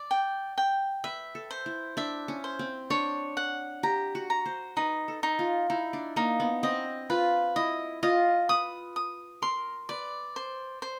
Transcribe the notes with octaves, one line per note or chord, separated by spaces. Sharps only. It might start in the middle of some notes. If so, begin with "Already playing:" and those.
Already playing: D5
G5
G5
B4 E5
A4
C5
E4
D4 E5
C#4
C5
C4
D4 C#5
F#5
G4 A#5
F#4
A#5
C5
D#4 B4
A4
D#4
F4
D#4 E4
D4
A#3 D#4
B3
C4 D#5
F4 B4
E4 D#5
F4 D#5
B4 D#6
D#6
A#4 C6
B4 D5
C5
C5